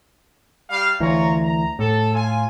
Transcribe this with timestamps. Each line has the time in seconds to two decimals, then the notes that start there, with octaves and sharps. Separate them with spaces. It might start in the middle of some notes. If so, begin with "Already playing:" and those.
0.70 G3 F5
1.00 D2 E3 F4 C#5 A#5
1.43 A#5
1.79 A2 A4
2.14 F4 G#5